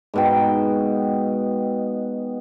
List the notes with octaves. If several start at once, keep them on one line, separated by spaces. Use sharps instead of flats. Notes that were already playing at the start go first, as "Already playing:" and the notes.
G#2 B2 G5